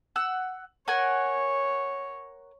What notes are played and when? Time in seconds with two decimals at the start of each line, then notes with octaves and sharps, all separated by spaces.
0.16 F#5 E6
0.88 A#4 C#5 F#5 G#5